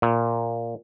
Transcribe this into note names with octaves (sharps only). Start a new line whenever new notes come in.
A#2